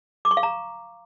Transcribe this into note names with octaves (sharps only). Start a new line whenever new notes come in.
D6
C#6
F5
A#5